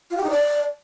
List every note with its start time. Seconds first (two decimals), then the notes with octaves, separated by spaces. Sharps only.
0.10 F4
0.17 G4
0.24 D#4
0.30 D5